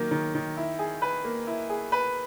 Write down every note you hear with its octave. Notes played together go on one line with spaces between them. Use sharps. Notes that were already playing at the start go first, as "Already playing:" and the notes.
Already playing: D#3 F#3 A#3
D#3
D#3
E4
G#4
B4
A#3
E4
G#4
B4